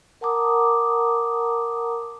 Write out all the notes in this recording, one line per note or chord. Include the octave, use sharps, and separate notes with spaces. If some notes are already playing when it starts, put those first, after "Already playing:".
A#4 F#5 A5 A#5 D6 D#6